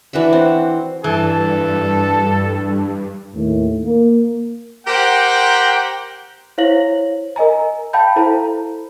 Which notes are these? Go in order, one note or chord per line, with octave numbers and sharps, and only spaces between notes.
E3 D4 F#4 E5
C4
G2 E3 A4
D#2 A2
A#3
G4 A#4 C5 F#5 G5
E4 C5 C#5 F5 A#6 F#7
A#4 D#5 G#5 A#5
F5 G5 A5 B5 G6
E4 A4 C5 F5 A#5